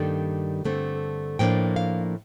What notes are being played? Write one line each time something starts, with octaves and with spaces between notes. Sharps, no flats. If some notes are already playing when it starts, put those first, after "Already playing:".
Already playing: G2 D#3 G3 A#3 D4 A4
G2 D3 A3 C4
A2 F3 A#3 D4 G5
F5